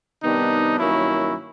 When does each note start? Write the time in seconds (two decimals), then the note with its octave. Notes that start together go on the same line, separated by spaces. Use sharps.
0.22 C3 D#3 G3 B3 D4 D#4
0.78 G2 D#3 F#3 A#3 C#4 E4